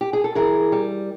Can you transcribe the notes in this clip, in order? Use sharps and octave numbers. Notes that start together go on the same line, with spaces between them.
G4
G#4
A4
E3 G#4 A#4
G3